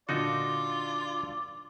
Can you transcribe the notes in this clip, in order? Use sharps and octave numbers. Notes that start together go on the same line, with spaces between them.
A#2 D3 D4 D#4 F4 F#4 D5